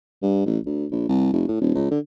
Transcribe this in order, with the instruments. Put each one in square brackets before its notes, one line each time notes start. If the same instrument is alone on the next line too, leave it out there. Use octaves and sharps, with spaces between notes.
[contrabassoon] G2
A1
D2
A#1
C2
F1
A2
D#1
C#2
D3